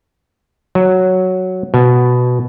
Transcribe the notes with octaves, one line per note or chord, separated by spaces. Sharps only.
F#3
B2